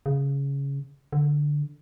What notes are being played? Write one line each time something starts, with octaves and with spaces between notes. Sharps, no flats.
C#3
D3